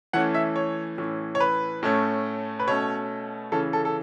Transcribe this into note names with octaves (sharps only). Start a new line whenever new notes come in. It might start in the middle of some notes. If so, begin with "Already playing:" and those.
E3 A3 C#4 F#5
E5
C#5
A2 E3 C#4
C#5
B4
A2 A3 C#4
B4
B2 A3 C#4 C#5
C#3 E3 C#4 A4
A4
A4